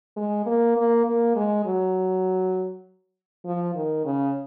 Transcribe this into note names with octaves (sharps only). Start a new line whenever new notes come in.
G#3
A#3
A#3
A#3
G#3
F#3
F3
D#3
C#3